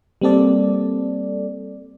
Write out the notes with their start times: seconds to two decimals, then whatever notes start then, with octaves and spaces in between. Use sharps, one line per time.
0.21 G3 A#3 C4 A4 D5